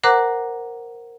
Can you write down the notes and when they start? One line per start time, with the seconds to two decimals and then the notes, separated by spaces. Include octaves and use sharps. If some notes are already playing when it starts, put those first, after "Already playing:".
0.03 A#4 C5 F#5 A#5 D6 F#6